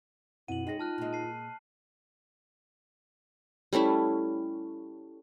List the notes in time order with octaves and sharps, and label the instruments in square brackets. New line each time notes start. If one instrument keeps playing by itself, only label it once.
[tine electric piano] F#2 C4 F#5 [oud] B2 [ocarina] E4 [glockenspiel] D#7 F#7
[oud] G#3 C#4 [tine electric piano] D#4 G5 A#6 [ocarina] G#4
[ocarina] F4 [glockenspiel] A5 F6 F#6
[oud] A#2 G#3
[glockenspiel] A5 C7
[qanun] G3 A3 C#4 E4